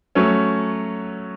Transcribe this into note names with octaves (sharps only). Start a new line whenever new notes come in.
F#3 A3 C#4